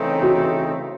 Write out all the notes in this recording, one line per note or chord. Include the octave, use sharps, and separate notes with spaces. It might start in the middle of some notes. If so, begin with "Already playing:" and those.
Already playing: C#3 E3 A3 C4 D#4
F#4